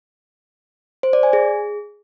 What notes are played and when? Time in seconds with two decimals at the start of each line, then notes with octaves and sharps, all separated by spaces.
1.03 C5
1.13 D5
1.23 G#5
1.33 G#4